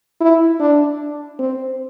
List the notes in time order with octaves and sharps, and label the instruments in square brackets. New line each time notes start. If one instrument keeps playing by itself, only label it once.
[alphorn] E4
D4
C4